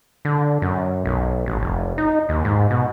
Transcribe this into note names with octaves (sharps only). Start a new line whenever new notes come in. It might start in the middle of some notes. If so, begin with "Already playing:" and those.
D3
F#2
B1
A1
F1
D#4
D#2
G#2
B2